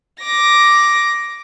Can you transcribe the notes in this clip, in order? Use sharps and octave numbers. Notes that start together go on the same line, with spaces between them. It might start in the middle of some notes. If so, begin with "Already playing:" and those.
D6 A#6